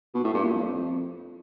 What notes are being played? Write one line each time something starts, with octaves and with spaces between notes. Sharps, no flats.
B2
A2
G2
A#2
F2